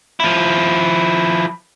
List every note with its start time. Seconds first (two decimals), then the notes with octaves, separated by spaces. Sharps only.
0.20 F3 E4